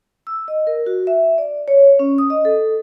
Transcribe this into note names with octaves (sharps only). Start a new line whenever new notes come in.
E6
D#5
A#4
F#4
E5
D5
C#5
C#4
D#6
D#5
A4